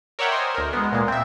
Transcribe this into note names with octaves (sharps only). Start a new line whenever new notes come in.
A#4 C#5 D5 E5 F#5 G5
C5 D#5 G#5
D2 A#4
G#3 B3
A#2 G#3 A#3
C4 E5